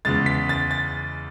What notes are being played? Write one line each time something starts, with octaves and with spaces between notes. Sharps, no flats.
E2 C#3 G#3 A6
B6
A6
A6